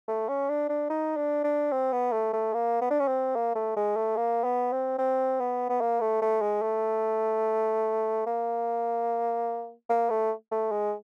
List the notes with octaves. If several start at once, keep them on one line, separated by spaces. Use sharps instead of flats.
A3
C#4
D4
D4
D#4
D4
D4
C4
B3
A3
A3
A#3
B3
D4
C#4
C4
A#3
A3
G#3
A3
A#3
B3
C4
C4
B3
B3
A#3
A3
A3
G#3
A3
A#3
A#3
A3
A3
G#3